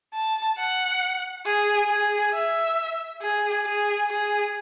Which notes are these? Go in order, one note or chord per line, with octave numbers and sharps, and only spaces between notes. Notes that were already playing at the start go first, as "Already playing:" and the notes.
A5
F#5
G#4
G#4
E5
G#4
G#4
G#4